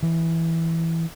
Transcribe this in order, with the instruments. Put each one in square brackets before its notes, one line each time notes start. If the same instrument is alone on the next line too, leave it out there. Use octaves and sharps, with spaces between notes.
[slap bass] E3